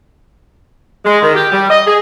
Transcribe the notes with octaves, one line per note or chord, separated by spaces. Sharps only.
G#3
D#3
G4
G3
D#5
G#4